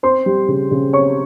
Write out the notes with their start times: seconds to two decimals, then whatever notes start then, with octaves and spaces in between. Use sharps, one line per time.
0.03 C4 C5 C6
0.26 G3
0.48 C#3
0.71 C#3
0.93 C4 C#5 C#6